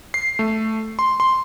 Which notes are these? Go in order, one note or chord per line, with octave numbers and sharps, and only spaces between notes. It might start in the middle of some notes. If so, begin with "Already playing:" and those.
C7
A3
C6
C6